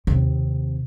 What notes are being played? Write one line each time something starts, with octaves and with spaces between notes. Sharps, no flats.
D#2 C3